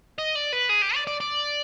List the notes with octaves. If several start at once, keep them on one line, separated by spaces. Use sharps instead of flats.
D#5
D5
B4
G#4
G4
D5
D5
D5